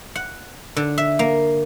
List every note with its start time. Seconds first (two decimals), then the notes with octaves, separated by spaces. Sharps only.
0.15 F#5
0.77 D3
0.98 E5
1.19 A#3